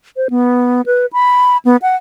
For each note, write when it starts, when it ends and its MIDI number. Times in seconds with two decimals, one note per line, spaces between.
0.17 0.28 72
0.30 0.82 59
0.86 1.06 71
1.13 1.57 83
1.65 1.77 59
1.82 1.96 78